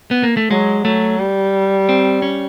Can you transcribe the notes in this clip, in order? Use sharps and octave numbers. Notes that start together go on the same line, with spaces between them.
B3
A#3
A3
F#3 G#3
F#3 A3
G3
C4
C#4